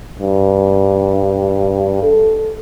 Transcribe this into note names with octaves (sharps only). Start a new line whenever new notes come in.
G2
A4